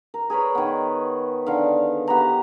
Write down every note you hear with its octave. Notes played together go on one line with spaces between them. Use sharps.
A#4
G#4 A#4 B4 C#5
D#3 B3
D3 D#3 F5
E3 B3 G4 A#5